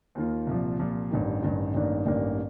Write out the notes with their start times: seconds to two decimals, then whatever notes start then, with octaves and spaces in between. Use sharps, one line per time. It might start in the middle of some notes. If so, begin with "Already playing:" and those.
0.15 D#2 D#3 A#3 F4
0.47 C2 A#2 F3
0.79 C2 A#2 F3
1.11 A1 G2 D#3
1.42 A1 G2 D#3
1.75 A1 G2 D#3 A#3 D4
2.06 A1 G2 D#3 A#3 D4